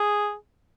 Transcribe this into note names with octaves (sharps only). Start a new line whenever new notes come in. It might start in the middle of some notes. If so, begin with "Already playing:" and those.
Already playing: G#4